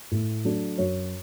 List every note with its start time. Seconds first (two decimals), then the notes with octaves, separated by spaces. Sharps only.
0.11 A2
0.45 F#3 A3 D4
0.78 F#2 C#5